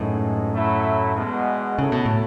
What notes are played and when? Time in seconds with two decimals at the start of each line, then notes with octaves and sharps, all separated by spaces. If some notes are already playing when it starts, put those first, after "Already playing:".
Already playing: F#2 A2 E3 G#3 D#4 A4
0.53 F#3 A3 E4
1.15 E2 B2 G#3 B3
1.78 C#3 F#3 A3 E4 A4
1.92 B2
2.06 A2